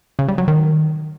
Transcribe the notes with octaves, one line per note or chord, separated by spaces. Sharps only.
C#3
G3
F#3
D#3